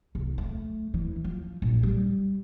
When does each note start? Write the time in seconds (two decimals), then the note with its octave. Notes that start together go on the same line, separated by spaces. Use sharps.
0.15 C2
0.38 A3
0.94 E3
1.24 F3
1.62 A#1
1.83 G3